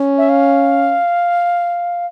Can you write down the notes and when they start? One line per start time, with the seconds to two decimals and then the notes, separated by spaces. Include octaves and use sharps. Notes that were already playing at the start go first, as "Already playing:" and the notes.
Already playing: C#4
0.18 E5
0.29 F5